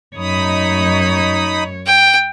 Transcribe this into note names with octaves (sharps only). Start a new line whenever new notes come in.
F#2 D#4 C#5 B5 D#6
G5